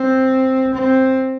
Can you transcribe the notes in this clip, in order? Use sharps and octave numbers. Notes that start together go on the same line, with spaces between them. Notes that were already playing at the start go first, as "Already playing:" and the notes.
Already playing: C4
C4